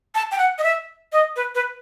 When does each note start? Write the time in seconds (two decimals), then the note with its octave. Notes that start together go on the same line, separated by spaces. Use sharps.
0.15 A5
0.32 G5
0.39 F#5
0.58 D#5
0.64 E5
1.13 D#5
1.36 B4
1.55 B4